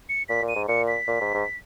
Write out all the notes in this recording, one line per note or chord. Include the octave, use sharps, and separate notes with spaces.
C#7
A#2 B6
A#2
D#7
G#2
A#2 C#7
B6
A#2
G#2
G#2